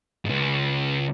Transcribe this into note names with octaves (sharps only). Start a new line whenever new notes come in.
C#2 G#2